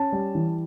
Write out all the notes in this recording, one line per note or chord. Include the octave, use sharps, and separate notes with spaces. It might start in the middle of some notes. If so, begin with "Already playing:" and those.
Already playing: C#4 A5
G3
E3